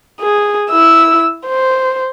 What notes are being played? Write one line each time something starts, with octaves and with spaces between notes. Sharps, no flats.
G#4
E4 E6
C5